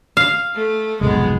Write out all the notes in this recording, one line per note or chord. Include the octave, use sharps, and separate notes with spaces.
F5
A3
F1 B1 G#2 G#3 B3